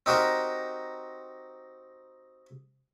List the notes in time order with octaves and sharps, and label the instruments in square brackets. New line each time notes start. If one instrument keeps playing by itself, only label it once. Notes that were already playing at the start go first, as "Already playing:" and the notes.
[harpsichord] C4 D#4 F#4 G4 A#4